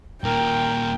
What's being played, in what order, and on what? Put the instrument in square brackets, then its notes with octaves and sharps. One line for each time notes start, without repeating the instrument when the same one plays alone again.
[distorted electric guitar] D#2 A#2 [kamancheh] A#4 [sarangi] G5